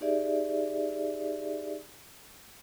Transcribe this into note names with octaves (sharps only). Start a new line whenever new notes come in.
D#4 G4 G#4 D5 E5